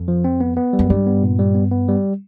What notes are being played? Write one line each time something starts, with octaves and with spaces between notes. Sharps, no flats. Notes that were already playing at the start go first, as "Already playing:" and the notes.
Already playing: F2
F3
C4
B3
B3
G3
F#2
G2 G3
B3
A#2
G3
B3
B3
G3